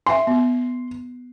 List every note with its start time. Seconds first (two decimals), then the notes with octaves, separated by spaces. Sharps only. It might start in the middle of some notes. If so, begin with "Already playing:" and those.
0.07 E5 G5 G#5 C6
0.27 B3